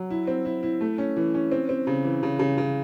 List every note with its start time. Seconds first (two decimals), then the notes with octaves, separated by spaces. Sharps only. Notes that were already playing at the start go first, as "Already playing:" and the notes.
Already playing: F#3
0.10 E4
0.27 C4
0.45 E4
0.63 E4
0.81 A3
0.98 C#4
1.17 E3
1.34 C#4
1.52 C4
1.69 C4
1.87 C#3
2.05 E3
2.23 C#3
2.39 C#3
2.58 C#3